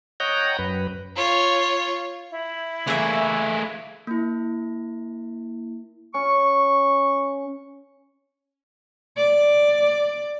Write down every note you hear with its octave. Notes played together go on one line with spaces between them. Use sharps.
C#5 D#5 F#5 G5 A#5
F#2 B4
F4 C#5
E4
E3 A3 A#3 G#4 E5
A#3 E4
C#4 C#6
D5